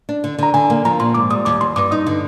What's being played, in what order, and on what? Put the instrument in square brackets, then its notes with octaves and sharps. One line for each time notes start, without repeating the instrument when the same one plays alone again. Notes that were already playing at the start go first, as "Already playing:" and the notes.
[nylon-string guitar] D4
D3
[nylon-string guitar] D3 [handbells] A#5
[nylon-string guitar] D3 [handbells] G#5
[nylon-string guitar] A#3
[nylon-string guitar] F3 [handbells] A#5
[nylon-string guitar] A#2 [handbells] C6
[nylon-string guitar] G#2 [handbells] D6
[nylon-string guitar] G3 [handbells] D#6
[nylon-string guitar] D#2 [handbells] D6
[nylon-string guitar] D#2 [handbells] C6
[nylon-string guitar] G2 [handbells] D6
[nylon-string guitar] D#4 [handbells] D#6
[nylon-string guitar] D3